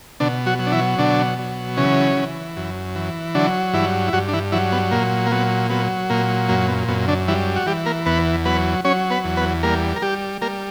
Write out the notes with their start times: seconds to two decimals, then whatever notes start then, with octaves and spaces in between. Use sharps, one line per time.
0.20 B2 D3 D4
0.46 F#3 F#4
0.59 F#3
0.67 D4
0.72 E3 E4
0.98 B2 D3 D4
1.39 F#3
1.77 C#3 E3 C#4
2.17 E3
2.56 F#2
2.95 E3
3.35 D3 F#3 D4
3.73 G2 E3 E4
4.08 E4
4.13 G2 F#3 F#4
4.28 D4
4.33 E3 E4
4.52 E3 F#3 E4
4.72 B3
4.91 A#2 A#3
5.26 A#3
5.31 F#3 B3
5.70 F#3 B3
6.10 A#2 A#3
6.49 F#2 A#3
6.68 B3
6.88 F#2 B3
7.08 D3 D4
7.28 E3 G3 E4
7.56 F#4
7.66 E3 G3 G4
7.86 A#3 A#4
8.06 E2 B3 B4
8.45 F#3 B3 B4
8.85 F#3 C#4 C#5
9.10 B3 B4
9.24 E2
9.37 B3 B4
9.63 G3 A#3 A#4
9.96 A#4
10.02 G3 G4
10.42 G3 A#3 A#4